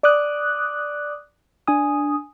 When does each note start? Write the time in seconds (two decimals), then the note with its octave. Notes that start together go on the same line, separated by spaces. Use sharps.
0.03 D5 D6 D#6 F#6
1.67 D4 G#5 D#6